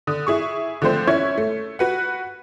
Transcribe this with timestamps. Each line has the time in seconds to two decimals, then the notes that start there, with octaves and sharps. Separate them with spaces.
0.07 D3 D#6
0.27 E4 G#4 C#6
0.82 D3 F3 A3 C4 C5
1.07 C#4 E4 C#6 G#6
1.38 A3
1.79 F#4 B4 F#5